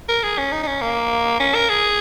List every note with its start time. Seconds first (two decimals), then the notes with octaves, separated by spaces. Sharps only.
0.09 A#4
0.23 G#4
0.38 C#4
0.52 D#4
0.63 D#4
0.67 C#4
0.82 A#3
1.40 C#4
1.55 A#4
1.69 G#4